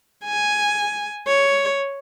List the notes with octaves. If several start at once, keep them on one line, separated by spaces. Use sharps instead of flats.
G#5
C#5